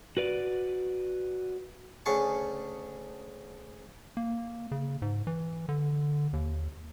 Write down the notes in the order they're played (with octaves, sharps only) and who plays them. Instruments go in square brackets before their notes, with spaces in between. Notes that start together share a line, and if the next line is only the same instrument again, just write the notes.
[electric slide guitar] F#4 B4 D5
[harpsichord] D2 C#3 G#4 C#5 A5
[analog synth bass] A#3
C#3
G#2
E3
D3
D#2